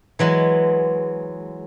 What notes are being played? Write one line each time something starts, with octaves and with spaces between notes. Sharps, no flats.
E3 F#3 G#3